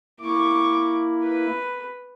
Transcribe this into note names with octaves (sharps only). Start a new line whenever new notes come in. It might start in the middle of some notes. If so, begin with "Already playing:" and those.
A#3 E4 C#6 D6
B4